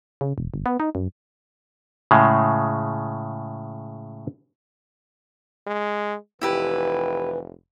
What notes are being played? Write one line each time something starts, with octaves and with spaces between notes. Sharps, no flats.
C#3
E1
G1
B3
D#4
F#2
A2 C#3 G#3
G#3
F1 E3 E4 G4 B4